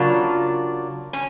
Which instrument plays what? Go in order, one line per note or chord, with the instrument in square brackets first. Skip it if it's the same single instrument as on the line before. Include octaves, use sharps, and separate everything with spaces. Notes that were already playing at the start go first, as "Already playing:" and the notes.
Already playing: [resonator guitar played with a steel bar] C#3 F#3 A#3 D4 F4
C#4